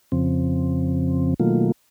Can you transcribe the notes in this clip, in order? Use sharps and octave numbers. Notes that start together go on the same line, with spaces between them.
F2 C#3 F3 C4
B2 D#3 F#3 A3 A#3 F4